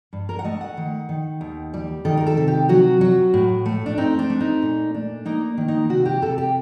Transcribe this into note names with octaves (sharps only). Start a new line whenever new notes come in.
G2
A#4
F#5
A3 D#5
F#5
D#3
D#3
D#2
G3
D#3 A4
A#4
A4
C3
G4
F#3 F#4
F#3
A2
A3
D4
C4 D#4
D4
A3
D#4
A#2
D4
A#3 D#4
D#3
D#4
C3 F#4
G4
C3 A4
G4